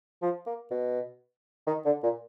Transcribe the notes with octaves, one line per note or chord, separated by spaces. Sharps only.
F3
A#3
B2
D#3
D3
A#2